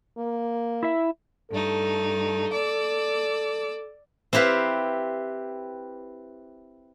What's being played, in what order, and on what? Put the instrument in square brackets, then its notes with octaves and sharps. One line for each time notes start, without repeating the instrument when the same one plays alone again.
[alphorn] A#3
[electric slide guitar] E4 E5
[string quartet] G2 A3 D#4 [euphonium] A4
[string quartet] D5 D6 E6
[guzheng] C4 E4 G4 B4 F5